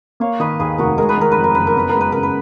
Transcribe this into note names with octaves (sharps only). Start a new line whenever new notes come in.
A#3 C#5 F5
D#3 B4 D#5
D#2 G#4 B4
F1 F#4 A#4
G#3 A#4
B4
D#3 A#4
F2 B4
A#4
F#1 B4
A#4
B3 B4
A#4
G#3
B4
C#3 A#4
B4